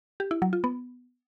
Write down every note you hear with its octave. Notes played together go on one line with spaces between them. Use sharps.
G4
E4
F#3
F4
B3